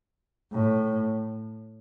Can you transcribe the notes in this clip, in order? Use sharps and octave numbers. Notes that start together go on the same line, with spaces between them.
A2